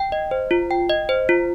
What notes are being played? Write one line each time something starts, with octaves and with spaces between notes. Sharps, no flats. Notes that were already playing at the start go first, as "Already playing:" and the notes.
Already playing: G5
D#5
C5
F4
G5
D#5
C5
F4